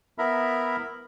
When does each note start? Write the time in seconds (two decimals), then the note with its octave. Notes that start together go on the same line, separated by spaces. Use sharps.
0.18 B3 E4 A#4 E5 A#5 B5